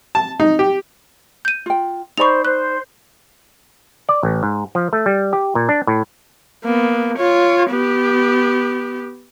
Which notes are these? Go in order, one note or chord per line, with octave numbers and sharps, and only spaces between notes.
A5
D#4
G4
G6 D#7
F4 G5
D#4 C5 D5 B5 C#6 F7
C5 F#6
D5
A1
G#2
F3
A3
G3
G4
A#2
D4
A2
A#3 B3
F4 C#5
B3 G4